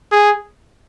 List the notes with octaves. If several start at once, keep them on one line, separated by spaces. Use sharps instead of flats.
G#4